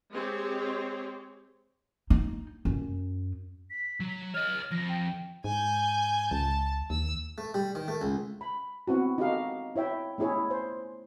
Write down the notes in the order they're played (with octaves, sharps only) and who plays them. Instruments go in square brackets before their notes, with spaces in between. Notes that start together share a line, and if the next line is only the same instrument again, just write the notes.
[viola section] G#3 C4 G4 C#5
[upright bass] D#4
F#2
[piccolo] B6
[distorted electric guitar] F#3
[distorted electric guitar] C#5 D#5 [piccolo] F6
[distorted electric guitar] F2 [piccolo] A#6
[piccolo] G5
[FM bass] G#2 [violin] G#5 G6
[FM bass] C#2 [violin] A5
[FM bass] D#2 [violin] E6
[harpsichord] A3
G3
D#3
A3
C#2
[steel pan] B5
B3 C4 E4 F#4
D#4 F#4 G4 A4 D#5 F5
E4 C#5 E5 G5
A3 B3 E4 G#4 C#5
C5